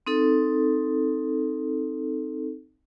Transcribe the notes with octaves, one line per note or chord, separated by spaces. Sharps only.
C4 D#4 A4